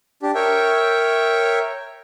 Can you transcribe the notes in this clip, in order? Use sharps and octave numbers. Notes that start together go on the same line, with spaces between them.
D4 G4
A#4 C#5 E5 G5